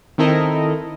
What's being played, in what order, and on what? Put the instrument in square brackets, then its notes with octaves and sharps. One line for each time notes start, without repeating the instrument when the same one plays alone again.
[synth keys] D#3 C4 E4 A4 A#4 D#5